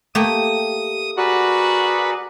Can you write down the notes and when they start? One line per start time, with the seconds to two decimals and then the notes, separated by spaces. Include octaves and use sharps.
0.15 A3 A#3 G4 D#6
1.17 F#4 G#4 A#4 B4 D5